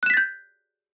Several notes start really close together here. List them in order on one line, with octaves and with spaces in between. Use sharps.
F#6 E7 B6 A6 G6